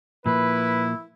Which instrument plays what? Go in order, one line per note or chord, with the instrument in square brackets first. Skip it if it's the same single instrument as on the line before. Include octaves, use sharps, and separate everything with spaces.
[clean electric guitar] A#2 F3 A#3 [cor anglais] E4 [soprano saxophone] B4